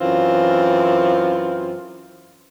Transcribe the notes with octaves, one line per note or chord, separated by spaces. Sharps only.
F#2 E3 C4 F4